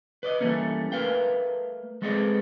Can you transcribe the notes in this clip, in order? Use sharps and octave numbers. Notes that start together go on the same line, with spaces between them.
B4 D5 D#5
E3 G3 A3 A#3 C#4
A3 A#4 B4 F5 G5
G#3 A3 B3 C4 G#4 D5